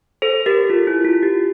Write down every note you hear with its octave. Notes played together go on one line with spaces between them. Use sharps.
A4 C5
G4 A#4
F4
E4
F4
G4